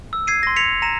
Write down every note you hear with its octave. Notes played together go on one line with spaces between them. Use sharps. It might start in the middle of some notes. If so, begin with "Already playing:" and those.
E6
G#6 C7 D#7
C6 A#6
G#6 B6 C#7 F7
A#5 A#6 C#7 D#7 E7